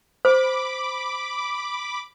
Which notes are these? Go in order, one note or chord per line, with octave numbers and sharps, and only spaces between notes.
C5 B5 D6